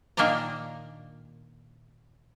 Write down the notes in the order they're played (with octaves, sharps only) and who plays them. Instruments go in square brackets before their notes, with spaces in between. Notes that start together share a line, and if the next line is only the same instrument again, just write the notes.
[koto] A#2 D#3 A#3 D4 D5 A#5